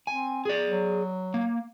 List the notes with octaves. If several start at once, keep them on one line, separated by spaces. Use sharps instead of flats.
C4 G#5
G#4 D5
F#3
A#3